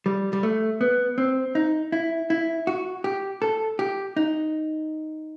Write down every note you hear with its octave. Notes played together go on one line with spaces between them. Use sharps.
G3
G3
A3
B3
C4
D#4
E4
E4
F#4
G4
A4
G4
D#4